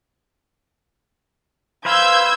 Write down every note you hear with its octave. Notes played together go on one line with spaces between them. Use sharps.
B4 C5 F5 E6 G6 G#6